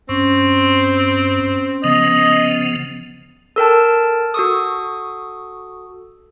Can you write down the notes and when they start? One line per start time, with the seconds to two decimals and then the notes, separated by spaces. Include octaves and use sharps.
0.09 G2 C4 C#4
1.84 C#3 F3 B3 D#5
3.56 A4 A#4 G5 A5
4.34 F#4 A4 C#6 D#6